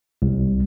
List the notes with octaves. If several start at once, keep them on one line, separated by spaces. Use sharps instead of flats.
C2